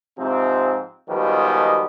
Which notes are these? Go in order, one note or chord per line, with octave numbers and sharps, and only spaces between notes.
G#2 C3 F3 C4
B2 D#3 F3 G3 G#3 B3